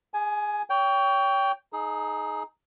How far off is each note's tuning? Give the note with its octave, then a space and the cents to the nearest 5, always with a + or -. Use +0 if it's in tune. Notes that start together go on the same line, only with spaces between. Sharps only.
G#4 -25 G#5 +15
C#5 +30 G5 +0
D#4 +0 G#4 +30